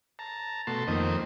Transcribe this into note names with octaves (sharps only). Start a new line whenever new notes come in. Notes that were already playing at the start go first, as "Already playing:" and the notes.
A5 A#5
B2 A3 F#4 A5 C6
F2 D#3 A#3 C4 D#5